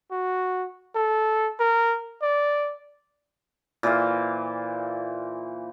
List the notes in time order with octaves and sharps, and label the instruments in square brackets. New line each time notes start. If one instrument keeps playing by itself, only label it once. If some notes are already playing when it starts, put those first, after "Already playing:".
[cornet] F#4
A4
A#4
D5
[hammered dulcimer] A#2 E3 C5 F5